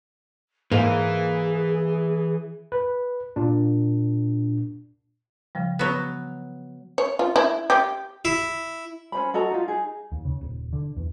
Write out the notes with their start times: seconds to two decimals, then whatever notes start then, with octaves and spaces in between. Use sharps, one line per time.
0.72 G#2 E3 A#3 G#4
2.72 B4
3.36 A#2 D4
5.55 C#3 F3 G3
5.79 F#3 B3
6.98 C#5
7.19 F4
7.36 E4
7.70 G4
8.25 E4
9.12 C#4 D#4 C5 B5
9.34 F#4 A4 D#5 A#5
9.51 D#4 F4
9.68 D#4 G#4
10.12 D#2
10.25 C#3
10.41 D#1
10.73 D3
10.96 E2